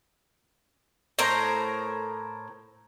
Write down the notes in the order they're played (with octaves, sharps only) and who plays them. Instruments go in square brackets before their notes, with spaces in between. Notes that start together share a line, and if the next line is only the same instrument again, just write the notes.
[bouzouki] A2 A#4 C5 A#5